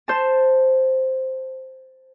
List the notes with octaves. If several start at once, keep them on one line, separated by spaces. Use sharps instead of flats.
C5 A5